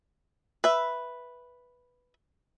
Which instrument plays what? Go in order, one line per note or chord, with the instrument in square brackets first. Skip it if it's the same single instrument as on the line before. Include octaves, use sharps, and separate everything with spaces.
[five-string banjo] B4 E5